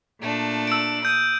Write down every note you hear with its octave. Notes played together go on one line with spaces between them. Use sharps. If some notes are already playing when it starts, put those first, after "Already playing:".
A#2 A3 D4
E6 D7
D#6 G6